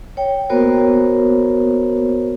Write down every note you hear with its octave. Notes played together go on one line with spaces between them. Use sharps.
C#5 G5
A#3 B3 F#4 A#4 C5 C#5